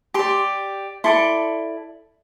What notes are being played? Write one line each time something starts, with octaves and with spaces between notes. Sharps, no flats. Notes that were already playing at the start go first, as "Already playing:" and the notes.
G4 D5 C6
E4 A4 D5 C6